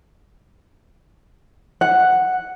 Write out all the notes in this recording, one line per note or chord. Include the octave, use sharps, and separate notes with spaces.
F#5